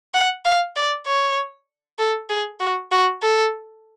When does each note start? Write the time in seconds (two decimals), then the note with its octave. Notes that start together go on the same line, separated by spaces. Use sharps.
0.14 F#5
0.45 F5
0.76 D5
1.07 C#5
1.99 A4
2.30 G#4
2.60 F#4
2.91 F#4
3.22 A4